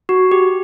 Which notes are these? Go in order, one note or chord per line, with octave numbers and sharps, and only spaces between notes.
F#4
G4